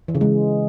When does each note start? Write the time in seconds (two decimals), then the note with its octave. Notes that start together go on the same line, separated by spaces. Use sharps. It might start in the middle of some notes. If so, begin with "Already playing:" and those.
0.08 E3
0.15 C#3
0.21 G#3